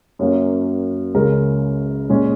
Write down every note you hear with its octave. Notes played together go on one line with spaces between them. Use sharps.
F#2 F#3 A#3 C#4
C#2 C#3 G#3 C#4 A#4
A#2 G#3 C#4 G#4